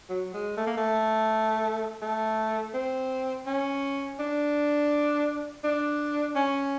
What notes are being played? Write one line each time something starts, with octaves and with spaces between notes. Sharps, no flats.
F#3
G#3
A3
A#3
A3
A3
C4
C#4
D4
D4
C#4